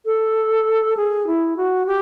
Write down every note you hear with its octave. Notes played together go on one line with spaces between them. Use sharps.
A4
G#4
E4
F#4
G4